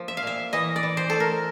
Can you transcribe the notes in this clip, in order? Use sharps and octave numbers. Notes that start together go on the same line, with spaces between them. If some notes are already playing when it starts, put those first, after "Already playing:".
Already playing: F3 A#3
E5
F5
A#2 E5
E3 D#5
D5
E3
C5
A3 A4
A#4